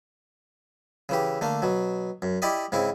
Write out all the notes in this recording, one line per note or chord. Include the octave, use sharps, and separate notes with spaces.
C#3 E3 G4
D3 A3 A#3
B2 F#3
F#2
E4 G4 D5 D#5
G#2 C#3 C4 E4